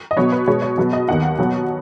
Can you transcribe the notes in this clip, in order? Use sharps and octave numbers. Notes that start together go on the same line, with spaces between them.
D#5
B2 F#3 B3 C#5
B4
B2 G#3 B3 C#5
C#5
B2 F#3 B3
D#5
D#2 D#3 B3 F#5
B2 F#3 B3